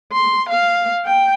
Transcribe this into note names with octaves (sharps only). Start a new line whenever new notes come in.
C6
F5
G5